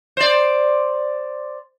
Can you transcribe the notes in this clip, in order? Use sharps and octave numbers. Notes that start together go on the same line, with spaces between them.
C5 D5